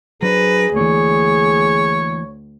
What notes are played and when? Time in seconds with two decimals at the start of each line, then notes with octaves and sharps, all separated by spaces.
0.22 F#3 D4 G#4 B4 C5 A#5
0.76 D2 E3 A#3 C#5